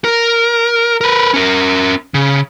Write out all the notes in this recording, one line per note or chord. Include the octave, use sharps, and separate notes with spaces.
A#4
A#4 B4
C#4 A#4
C#3